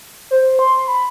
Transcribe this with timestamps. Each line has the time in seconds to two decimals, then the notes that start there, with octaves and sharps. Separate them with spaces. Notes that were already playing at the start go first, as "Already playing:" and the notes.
0.31 C5
0.59 C6
0.88 B5